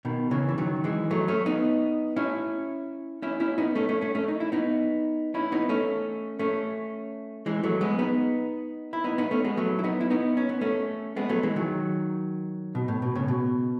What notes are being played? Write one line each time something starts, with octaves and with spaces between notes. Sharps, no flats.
B2 D#3
C#3 E3
E3
D#3 F#3
E3 G#3
F#3 A3
A3 C#4
B3 D#4
C#4 E4
C#4 E4
C#4 E4
B3 D#4
A3 C#4
A3 C#4
A3 C#4
A3 C#4
D#4
E4
B3 D#4
C#4 E4
B3 D#4
A3 C#4
A3 C#4
E3 G#3
F#3 A3
G#3 B3
B3 D#4
E4
B3 D#4
B3 D#4
A3 C#4
G#3 B3
F#3 A3
E4
B3 D#4
E4
B3 D#4
C#4
B3
A3 C#4
G#3 B3
F#3 A3
E3 G#3
D#3 F#3
B2
A2
B2
A2 C#3
B2